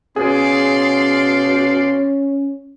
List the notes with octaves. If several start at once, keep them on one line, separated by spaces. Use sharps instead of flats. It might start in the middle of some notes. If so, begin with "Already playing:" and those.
B2 C#4 G#4 D5 F5 C6